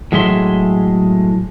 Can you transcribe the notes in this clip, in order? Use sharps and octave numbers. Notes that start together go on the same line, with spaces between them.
A2 F#3 G#3 G#4 E5 C6